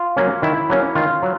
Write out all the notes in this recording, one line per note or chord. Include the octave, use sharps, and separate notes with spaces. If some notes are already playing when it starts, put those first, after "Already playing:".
Already playing: F4
F#3 A#3 C#4
D#3 E4
F#3 A#3 C#4
D#3 F4
F#3